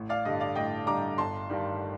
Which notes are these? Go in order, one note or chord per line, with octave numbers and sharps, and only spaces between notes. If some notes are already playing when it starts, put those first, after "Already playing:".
Already playing: A1
D5 F5
G2 D3 G3 D#5
D5 F5
A1 D#5 G5
G2 D3 G3 A#5 D6
G1 A5 C6
G2 D#3 G3